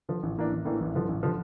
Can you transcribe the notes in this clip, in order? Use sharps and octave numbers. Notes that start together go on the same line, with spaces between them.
D3 F3
A1
A2 E3 A#3 D4
A1
A2 E3 A#3 D4
A1
G2 D3 F3
A1
D3 F3